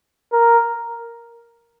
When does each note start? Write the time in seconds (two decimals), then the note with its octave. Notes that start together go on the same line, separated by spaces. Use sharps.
0.33 A#4